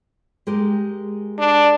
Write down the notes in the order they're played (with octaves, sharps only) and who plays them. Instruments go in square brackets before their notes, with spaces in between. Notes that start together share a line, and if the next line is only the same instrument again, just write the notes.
[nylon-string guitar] G#3 G4 A#4
[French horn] D4